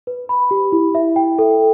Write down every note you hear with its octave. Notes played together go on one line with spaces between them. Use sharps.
B4
B5
G4
E4
E5
G5
A4